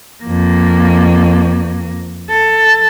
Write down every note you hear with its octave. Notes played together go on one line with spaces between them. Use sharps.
F2 A#3
A4